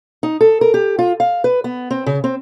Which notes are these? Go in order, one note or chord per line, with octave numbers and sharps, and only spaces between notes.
D#4
A4
A#4
G4
F4
F5
B4
B3
C4
C#3
C4